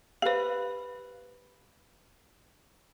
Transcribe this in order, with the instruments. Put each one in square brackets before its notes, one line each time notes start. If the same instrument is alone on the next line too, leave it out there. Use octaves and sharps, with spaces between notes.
[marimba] G4 C5 [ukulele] B4 F5